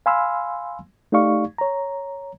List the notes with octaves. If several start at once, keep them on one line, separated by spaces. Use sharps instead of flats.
F5 G#5 B5 C6 E6 F6
A3 D#4 G4 D5 F5 C#6
C#5 A#5